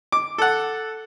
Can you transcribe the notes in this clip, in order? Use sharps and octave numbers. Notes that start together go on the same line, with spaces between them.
D6
A4 F#5